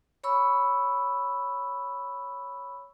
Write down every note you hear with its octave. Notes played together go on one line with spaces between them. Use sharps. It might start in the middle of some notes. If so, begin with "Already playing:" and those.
C#5 B5 C#6 E6